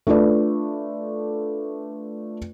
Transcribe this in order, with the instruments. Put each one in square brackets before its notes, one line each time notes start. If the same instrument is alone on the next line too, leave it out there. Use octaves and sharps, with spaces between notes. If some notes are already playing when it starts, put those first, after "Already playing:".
[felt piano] A3 D4 F4 B4 D5